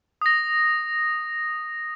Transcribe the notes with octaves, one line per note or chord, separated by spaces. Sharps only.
D#6 A#6